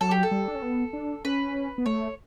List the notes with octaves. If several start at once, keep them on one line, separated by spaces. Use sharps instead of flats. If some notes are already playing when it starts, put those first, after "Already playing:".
F#3 A4
G4
A4
G3
D4
C#4
B3
D4
C#4 B4
B3
A3 C#5